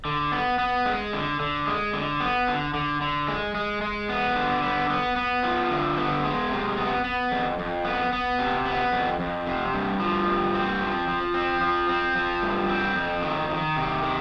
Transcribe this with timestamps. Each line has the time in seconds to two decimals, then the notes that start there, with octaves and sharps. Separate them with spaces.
0.05 D3
0.32 B3
0.59 B3
0.86 G#3
1.13 D3
1.40 D3
1.67 G#3
1.93 D3
2.20 B3
2.48 D3
2.74 D3
3.01 D3
3.28 G#3
3.55 G#3
3.82 G#3
4.09 B3
4.36 D3
4.63 B3
4.90 B3
5.16 B3
5.43 F3
5.70 D3
5.97 B3
6.24 G#3
6.51 C3
6.77 B3
7.04 B3
7.31 F2
7.59 F2
7.84 B3
8.13 B3
8.39 C3
8.66 B3
8.92 F2
9.20 F2
9.47 C3
9.74 G2
10.00 F3
10.27 G2
10.54 C4
10.81 F3
11.08 F3
11.34 C4
11.61 F3
11.89 C4
12.16 F3
12.43 G2
12.69 C4
12.96 F2
13.22 D#3
13.50 D#3
13.77 C3
14.03 D#3